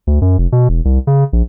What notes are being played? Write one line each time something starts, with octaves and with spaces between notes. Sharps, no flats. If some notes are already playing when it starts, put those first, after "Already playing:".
D2
F#2
F1
B2
E1
C2
C#3
A#1